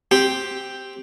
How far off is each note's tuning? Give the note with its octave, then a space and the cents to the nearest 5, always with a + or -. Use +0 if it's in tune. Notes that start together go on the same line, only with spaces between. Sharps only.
C4 +0 G4 +0